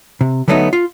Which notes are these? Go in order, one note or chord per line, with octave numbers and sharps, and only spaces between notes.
C3
D3 F#3 G3 A3 B3 D#4
F4